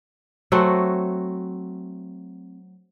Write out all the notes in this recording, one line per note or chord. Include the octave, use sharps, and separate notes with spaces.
F#3 A3 C4 F#4